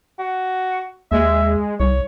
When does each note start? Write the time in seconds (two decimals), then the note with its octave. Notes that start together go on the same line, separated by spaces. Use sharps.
0.19 F#4
1.11 D#2 G#3 E5
1.80 C2 C#5